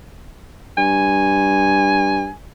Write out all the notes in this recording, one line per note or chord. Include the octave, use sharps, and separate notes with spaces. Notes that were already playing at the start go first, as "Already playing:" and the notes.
G2 G#5